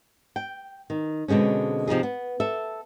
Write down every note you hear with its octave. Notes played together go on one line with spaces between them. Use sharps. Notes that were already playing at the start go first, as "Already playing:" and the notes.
G5
D#3
B2 D3 G#3 C4 C#4
C3 F3 D#4 G#4
B3
A4 E5